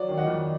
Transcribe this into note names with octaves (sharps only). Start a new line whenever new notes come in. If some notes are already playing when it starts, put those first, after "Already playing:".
Already playing: F#3 D5
D#3
D#5 F#5
F2